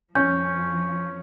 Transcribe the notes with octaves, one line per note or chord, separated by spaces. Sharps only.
F2 F3 C#4 C#6 G6